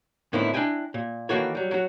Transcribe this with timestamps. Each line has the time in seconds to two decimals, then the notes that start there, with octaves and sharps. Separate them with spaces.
0.33 A2 D3 D#3 B3 C4 E4
0.54 D4 E4 D#5 G5 G#5
0.94 A#2
1.29 D#3 E3 A#3 F#4 A4 C#5
1.55 F#3 G3
1.71 F#3 F#4